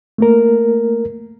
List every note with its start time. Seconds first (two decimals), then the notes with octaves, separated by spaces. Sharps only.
0.18 A3 A#3 A#4